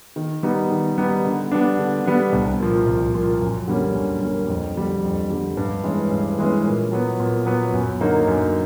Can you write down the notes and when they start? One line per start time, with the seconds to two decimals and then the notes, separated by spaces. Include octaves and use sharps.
0.16 D#3
0.43 G3 B3 D#4
0.71 D#3
0.98 G3 B3 D#4
1.25 D3
1.52 G3 B3 D4
1.79 D3
2.06 G3 B3 D4
2.33 C2
2.60 A#2 F3
2.86 C2
3.14 A#2 F3
3.41 F#2
3.68 D3 G3 A#3 C#4
3.95 F#2
4.22 D3 G3 A#3 C#4
4.49 F2
4.76 D3 G3
5.03 F2
5.30 D3 G3
5.57 G2
5.84 E3 G#3 C#4
6.11 G2
6.39 E3 G#3 C#4
6.65 A#2
6.92 F#3 B3
7.20 A#2
7.46 F#3 B3
7.73 F#2
8.01 D3 F#3 A#3 D#4
8.28 F#2